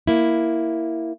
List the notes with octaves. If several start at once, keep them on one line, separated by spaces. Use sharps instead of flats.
A#3 E4